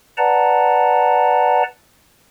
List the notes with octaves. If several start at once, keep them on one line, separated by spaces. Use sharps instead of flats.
B4 D5 F#5 A5 A#5